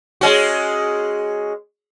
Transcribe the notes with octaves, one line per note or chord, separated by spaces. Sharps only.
G#3 C#4 F#4